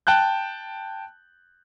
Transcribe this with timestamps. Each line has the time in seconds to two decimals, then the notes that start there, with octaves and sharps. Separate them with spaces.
0.07 G5 A5 F#6 G6